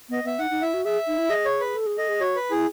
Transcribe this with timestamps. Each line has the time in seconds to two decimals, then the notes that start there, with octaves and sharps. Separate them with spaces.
0.09 B3 D#5
0.24 B3 E5
0.39 D#4 F#5
0.50 D#4
0.62 E4 E5
0.74 F#4
0.85 G#4 E5
1.07 D#4
1.18 E4
1.30 G#4 D#5
1.45 C#5
1.60 B4
1.75 A4
1.86 G#4
1.98 A4 D#5
2.09 G#4
2.21 F#4 C#5
2.36 B4
2.50 E4 G#4